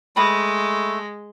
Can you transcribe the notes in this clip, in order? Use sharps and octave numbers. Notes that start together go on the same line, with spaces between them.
G#3 A3 B4 B5 D#6